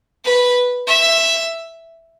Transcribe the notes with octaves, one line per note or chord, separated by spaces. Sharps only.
B4
E5